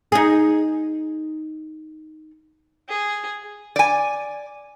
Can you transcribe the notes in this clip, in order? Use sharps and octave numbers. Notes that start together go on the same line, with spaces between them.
D#4 G#4
G#4
D5 G#5